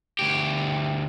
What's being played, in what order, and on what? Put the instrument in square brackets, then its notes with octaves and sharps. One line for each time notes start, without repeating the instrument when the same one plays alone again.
[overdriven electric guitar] D2 G4